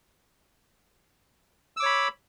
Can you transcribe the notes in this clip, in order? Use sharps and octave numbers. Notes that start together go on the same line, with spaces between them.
C#5 B5 D6 E6